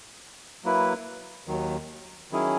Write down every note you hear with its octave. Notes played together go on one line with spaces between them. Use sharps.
F#3 A#3 E4 B4
D#2 D#3 F#3
D#3 F#3 C#4 E4 G#4